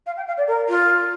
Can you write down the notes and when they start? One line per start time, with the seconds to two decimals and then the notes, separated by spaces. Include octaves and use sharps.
0.06 F5
0.17 G5
0.27 F5
0.37 D5
0.47 A#4
0.68 F4